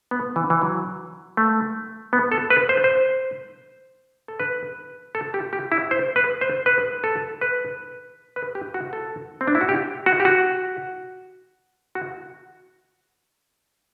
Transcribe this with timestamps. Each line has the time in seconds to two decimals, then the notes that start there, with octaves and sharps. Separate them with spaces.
0.11 B3
0.36 E3
0.50 E3
0.62 F#3
1.37 A3
2.13 B3
2.32 A4
2.50 B4
2.69 C5
2.84 C5
4.28 A4
4.40 B4
5.15 A4
5.34 G4
5.53 G4
5.72 E4
5.91 C5
6.16 B4
6.41 C5
6.66 B4
7.04 A4
7.41 B4
8.36 B4
8.55 G4
8.74 F#4
8.93 A4
9.41 C4
9.47 D4
9.55 E4
9.61 F#4
9.69 G4
10.06 F#4
10.20 G4
10.25 F#4
11.95 F#4